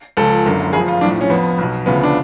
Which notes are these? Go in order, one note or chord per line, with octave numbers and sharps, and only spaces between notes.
C#2 C#3 F3 A4
F#1 F#2 D3
F1 F2 F3 G#4
F4
B1 A2 F3 D4
C#4
F1 F2 F3 B3
B1 B2
D2 C#3 F3 B3
D4